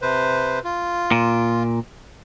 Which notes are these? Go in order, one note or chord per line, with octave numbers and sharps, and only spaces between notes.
C3 B4 C5
F4
A#2